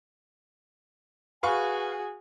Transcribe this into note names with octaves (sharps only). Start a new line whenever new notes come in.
F#4 G#4 B4 F5 G#5 C#6